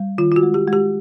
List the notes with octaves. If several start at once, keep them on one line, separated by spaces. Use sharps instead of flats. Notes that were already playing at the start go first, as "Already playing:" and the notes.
Already playing: G3
D#3 F4
F4
F#4
G#3
G4
G#3
G4